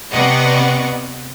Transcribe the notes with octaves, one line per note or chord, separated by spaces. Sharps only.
C3 B3 D5 D#5 F#5 C#6